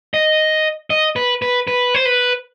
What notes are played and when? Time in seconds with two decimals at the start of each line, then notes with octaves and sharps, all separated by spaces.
0.14 D#5
0.90 D#5
1.16 B4
1.42 B4
1.67 B4
1.94 C5
2.05 B4